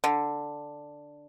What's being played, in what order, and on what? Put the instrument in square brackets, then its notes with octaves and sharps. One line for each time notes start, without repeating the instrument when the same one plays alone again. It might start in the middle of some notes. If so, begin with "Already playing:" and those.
[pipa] D3